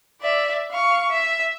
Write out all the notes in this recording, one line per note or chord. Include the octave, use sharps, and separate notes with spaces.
D5 E5
F5 C#6
E5